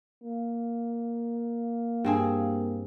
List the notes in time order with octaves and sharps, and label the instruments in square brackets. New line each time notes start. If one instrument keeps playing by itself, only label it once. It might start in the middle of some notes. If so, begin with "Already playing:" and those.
[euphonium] A#3
[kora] G2 C4 G#4